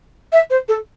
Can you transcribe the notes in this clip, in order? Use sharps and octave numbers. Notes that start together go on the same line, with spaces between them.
E5
C5
A4